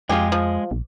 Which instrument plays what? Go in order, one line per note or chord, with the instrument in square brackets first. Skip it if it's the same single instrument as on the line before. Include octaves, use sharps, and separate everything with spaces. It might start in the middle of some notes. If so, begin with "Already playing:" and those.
[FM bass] F2 [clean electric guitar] G#3 G#4 [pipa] F4 G4
[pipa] F3
[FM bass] A#1